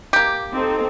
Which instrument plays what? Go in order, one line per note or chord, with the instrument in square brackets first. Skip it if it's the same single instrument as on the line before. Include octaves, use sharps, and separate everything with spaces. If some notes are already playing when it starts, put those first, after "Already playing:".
[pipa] A#3 G4
[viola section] C4 D#4 A4